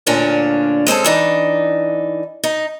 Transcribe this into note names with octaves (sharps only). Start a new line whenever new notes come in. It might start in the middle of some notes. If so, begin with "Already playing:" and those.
D2 A#2 D3 C#4 D4 F4
G#3 C4 C#4 A4
E3 D4 D#4
D#4